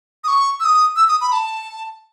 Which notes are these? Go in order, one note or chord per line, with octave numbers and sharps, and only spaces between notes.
D#6
C#6
E6
D#6
E6
D#6
B5
A5